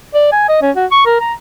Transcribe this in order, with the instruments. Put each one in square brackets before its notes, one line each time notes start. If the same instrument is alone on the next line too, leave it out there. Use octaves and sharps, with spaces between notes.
[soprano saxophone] D5
G#5
D#5
C#4
F#4
C#6
A#4
A#5